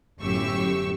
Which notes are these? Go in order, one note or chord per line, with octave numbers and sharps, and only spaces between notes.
G1 F#2 A2 G4 C#6 E6